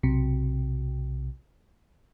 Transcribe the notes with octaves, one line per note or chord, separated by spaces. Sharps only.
B1 C3